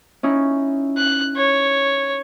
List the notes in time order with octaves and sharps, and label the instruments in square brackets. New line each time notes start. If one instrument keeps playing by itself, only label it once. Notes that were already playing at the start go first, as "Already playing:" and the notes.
[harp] C#4 D#4 E4
[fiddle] F#6
C#5